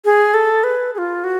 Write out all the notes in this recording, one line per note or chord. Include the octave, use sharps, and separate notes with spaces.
G#4
A4
B4
G#4
F4
F#4